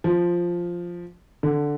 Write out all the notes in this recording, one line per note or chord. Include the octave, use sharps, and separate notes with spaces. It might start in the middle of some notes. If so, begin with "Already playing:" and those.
F3
D3